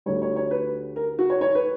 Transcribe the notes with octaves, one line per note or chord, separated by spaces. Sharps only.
D2 D3 G3 C#5
C#5
C#5
B4
A#4
F#4
C#5
C#5
B4